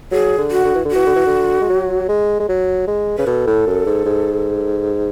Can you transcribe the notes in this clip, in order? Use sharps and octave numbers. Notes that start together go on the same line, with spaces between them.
F#3 G#4
D3
F#4
D3
E3
D3
E3 F#4
D3
E3
D3
G#3
F#3
G#3
G#3
F#3
G#3
C#3 B4
B2 A4
A2
F#2
G#2
G#2